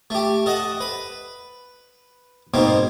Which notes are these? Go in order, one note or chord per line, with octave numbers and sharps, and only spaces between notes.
A3 G4
A4 D#5 F#5 A5
B4
G#2 B2 A#3 C4